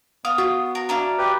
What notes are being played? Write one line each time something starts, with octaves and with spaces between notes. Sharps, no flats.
B3 F5 D#6
F4 F#4
A#4
D4 E4 F5 A#5
G4 B4